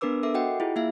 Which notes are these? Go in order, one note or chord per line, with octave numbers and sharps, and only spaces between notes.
B3 D4 A#4 B4 D6 E6
A4 A#4 E5 D6
F#4 D#5 F#5 G5
E4 F4 G#4
A#3 E4 E5 F5